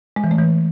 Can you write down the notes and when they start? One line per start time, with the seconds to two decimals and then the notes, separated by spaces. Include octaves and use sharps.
0.16 G#3
0.24 E3
0.31 A3
0.38 E3